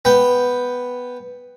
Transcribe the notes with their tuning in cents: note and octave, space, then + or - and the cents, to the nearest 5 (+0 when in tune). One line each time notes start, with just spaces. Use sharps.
B3 +0 G5 +0